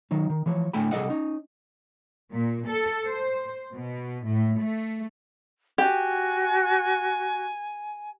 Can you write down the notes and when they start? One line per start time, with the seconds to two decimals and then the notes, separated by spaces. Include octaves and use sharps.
0.11 D#3 F#3 D#4
0.30 D#3
0.46 E3 F3 C#5
0.73 A2 D3 A3 G5 G#5 B5
0.92 C3 G3 G#4 A4 D#5 F#5
1.10 C#4 D#4
2.32 A#2
2.69 A4
3.06 C5
3.72 B2
4.24 A2
4.59 A3
5.78 F#4 G4 G#5